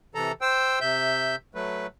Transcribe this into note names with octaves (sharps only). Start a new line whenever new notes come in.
C3 E3 A4 A#5
C5 G5 E6
C3 E5 G6
F#3 A3 B4